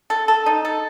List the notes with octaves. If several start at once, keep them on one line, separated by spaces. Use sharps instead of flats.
A4
A4
D#4
A4